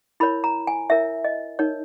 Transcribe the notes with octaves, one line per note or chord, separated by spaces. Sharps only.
E4 A#4 C#5 B5
A#5
G#5
E4 A#4 C#5 E5
D#5
D#4 A#4 C#5